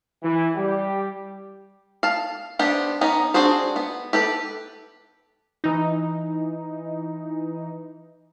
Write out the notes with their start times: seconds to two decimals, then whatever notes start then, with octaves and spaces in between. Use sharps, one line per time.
0.23 E3
0.56 G3 G4
2.03 F5 A5
2.59 B3 D4 G4 C5
3.01 B3 C#4 D#4
3.34 C4 D4 F#4 G#4 C5
3.76 B3
4.13 G4 A4 B4
5.64 E3 D#4